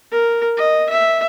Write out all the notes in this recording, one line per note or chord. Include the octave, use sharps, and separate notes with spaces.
A#4
D#5
E5